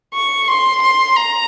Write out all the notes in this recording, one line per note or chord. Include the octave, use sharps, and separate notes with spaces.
C#6
C6
C6
A#5